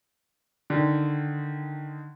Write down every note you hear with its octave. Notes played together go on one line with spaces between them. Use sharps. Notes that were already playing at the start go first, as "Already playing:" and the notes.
D3 D#3